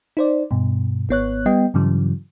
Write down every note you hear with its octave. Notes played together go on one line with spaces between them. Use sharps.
D#4 C5 D5
G2 B2
G#1 B3 C#5 F#6
G3 B3 D#5 G5
G2 C#3 E3 F#3